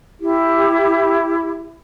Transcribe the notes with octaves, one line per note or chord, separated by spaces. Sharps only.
E4 G4